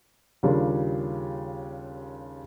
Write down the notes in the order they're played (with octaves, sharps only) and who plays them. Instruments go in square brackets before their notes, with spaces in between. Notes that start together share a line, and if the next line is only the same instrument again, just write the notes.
[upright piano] D#2 C#3 G3 D4 F4 A#4